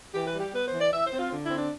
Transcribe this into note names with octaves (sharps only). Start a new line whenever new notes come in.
E3 G4
B4
G3
G4
B3 B4
C5
E3
D5
E3 E5
C5
C4
F4
D3
E4
C4
D4